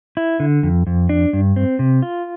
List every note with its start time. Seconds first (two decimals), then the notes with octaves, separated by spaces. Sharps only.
0.17 E4
0.40 D3
0.63 F2
0.87 F2
1.09 D4
1.33 G2
1.56 C4
1.79 C3
2.02 F4